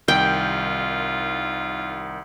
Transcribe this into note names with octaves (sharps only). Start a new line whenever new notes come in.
C2 D#3 F4 G5